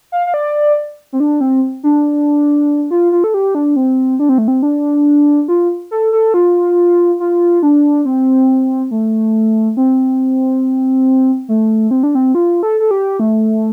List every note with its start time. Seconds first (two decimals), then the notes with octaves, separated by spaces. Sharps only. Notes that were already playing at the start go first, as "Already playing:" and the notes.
0.12 F5
0.27 F5
0.34 D5
1.13 C4
1.20 D4
1.41 C4
1.83 D4
2.91 F4
3.12 F4
3.24 A4
3.34 G4
3.55 D4
3.76 C4
4.19 D4
4.29 C4
4.38 A3
4.48 C4
4.63 D4
5.48 F4
5.91 A4
6.13 A4
6.34 F4
7.20 F4
7.63 D4
8.05 C4
8.91 A3
9.77 C4
11.48 A3
11.91 C4
12.03 D4
12.15 C4
12.35 F4
12.63 A4
12.80 A4
12.91 G4
13.20 A3